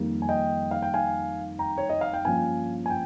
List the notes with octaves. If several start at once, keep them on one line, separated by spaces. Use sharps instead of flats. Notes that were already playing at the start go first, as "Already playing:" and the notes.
Already playing: F2 D#3 G3 A#3
G#5
D#5 G5
F5
G5
F5 G#5
G5 A#5
C#5
D#5
F5
G5
G2 F3 A#3 C#4 F5 G#5
G#5
G5